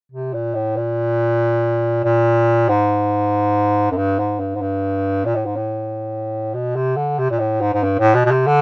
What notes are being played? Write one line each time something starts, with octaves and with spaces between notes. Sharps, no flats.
C3
A#2
A2
A#2
A#2
G#2
F#2
G2
G#2
G2
G#2
G2
A#2
A2
G#2
A2
B2
C3
D3
C3
A#2
A2
G#2
G#2
G2
A2
B2
B2
C3
D3